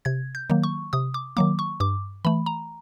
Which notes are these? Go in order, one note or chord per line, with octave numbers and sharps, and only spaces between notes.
C3 G#6
G6
D#3 F#3 A#3
C#6
C3 D#6
D6
D#3 F#3 A#3 D6
C#6
G2 D6
E3 A3 B5
A#5